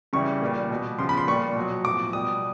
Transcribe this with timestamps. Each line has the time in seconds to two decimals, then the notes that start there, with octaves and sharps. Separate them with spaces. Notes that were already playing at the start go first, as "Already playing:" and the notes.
0.13 C#3 E3 G3 C#6
0.42 A#2 G3
0.70 B2 G3
0.98 C#3 F3 C6
1.09 B5
1.18 C6
1.27 A#2 G3 C#6
1.56 B2 F#3
1.85 A2 F3 D6
2.13 B2 G3 D#6